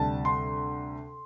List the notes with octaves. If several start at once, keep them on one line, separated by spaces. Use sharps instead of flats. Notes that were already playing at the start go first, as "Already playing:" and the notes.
Already playing: D2 C3 G3 A5
C6